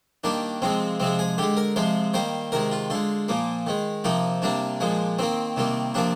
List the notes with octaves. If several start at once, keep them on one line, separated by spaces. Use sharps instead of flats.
D#3 G3 A#3 D4
C3 F3 G#3 C4
C3 F3 G#3 C4
G#4
D3 G#3 G4
A#4
C3 F3 G#3 C5
D#3 G3 A#3 C5
C3 D#3 G#3 A#4
F4
D3 G#3 F4
A#2 F3 A#3
D#3 G#3
C3 F3 A#3 D#4
C3 G3 A#3 D4
A#2 F3 G#3
D#3 A#3 C4
C3 D#3 G3 A#3
C3 F3 A#3 D4